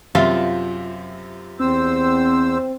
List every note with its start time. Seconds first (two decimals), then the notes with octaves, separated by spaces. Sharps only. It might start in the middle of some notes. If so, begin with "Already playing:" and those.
0.15 F#2 C3 F4 E5
1.60 E2 C4 C5 E6